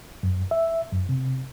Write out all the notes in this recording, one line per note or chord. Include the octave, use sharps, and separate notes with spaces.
F#2
E5
F#2
C3